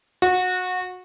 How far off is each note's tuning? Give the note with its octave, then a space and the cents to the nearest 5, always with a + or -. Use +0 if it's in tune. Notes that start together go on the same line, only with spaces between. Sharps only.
F#4 -20